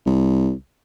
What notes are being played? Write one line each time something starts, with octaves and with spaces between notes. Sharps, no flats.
C2